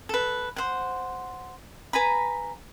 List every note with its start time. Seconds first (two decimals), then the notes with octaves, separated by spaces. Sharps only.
0.09 A4 B4
0.56 C5 F#5
1.93 B4 G#5 A#5 B5